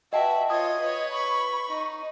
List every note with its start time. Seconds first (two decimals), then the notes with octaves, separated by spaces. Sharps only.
0.13 F#4 B4 D#5 E5 G5 A5
0.50 F4 C#5 D#5 D#6 G#6
0.80 B4 C#5
1.12 B5 C#6
1.69 D#4